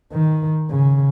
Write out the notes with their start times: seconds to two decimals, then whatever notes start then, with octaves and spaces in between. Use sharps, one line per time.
0.12 D#3
0.70 C#3